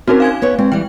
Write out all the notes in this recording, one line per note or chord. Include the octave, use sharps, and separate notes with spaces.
C4 C#4 D#4 F#4 A#4
F5 G#5 G#6
B3 B4 C#5
G#3 C4
E3 G3 G5